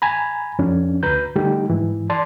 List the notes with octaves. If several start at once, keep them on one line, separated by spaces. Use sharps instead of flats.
G#5 A#5 B5
F2 C#4 D4
D2 B4 A#5 G6
D3 G3 A3 D#4 G4
G#2 E3
D5 A5 C6